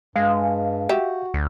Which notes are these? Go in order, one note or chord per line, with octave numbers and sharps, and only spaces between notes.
G2 G#3 F5
F#4 G4 E5
D2